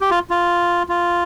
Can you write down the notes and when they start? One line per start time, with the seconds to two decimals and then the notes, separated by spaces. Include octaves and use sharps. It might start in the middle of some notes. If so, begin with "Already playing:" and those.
0.01 G4
0.11 F4
0.30 F4
0.89 F4